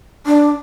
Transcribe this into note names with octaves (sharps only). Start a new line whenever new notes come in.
D4